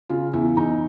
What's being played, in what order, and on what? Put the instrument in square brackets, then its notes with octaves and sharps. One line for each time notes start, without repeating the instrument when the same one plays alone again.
[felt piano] C#3 F4
E2 E4
E2 D#4